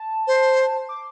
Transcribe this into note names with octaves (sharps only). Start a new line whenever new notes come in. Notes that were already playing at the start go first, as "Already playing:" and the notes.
Already playing: A5
C5
D6